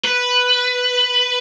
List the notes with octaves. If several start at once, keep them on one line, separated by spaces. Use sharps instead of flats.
B4